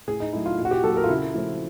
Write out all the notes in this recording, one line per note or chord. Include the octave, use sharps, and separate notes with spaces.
A2 G#4
D#4
F#3 A3 E4
F4
A#2
F#4
G4
F#3 A#3 A4
A#4
F4
C#3 E4
F3 A3 C4